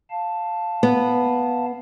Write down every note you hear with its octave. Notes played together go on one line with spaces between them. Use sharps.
F5 A5
B3